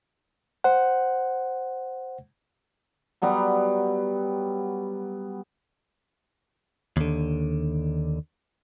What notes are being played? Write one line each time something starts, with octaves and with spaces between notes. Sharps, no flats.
C5 F#5
F#3 G3 B3 A#5
D#2 D3